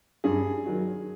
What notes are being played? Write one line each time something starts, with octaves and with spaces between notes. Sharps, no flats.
G2 G#4
D#3 F#3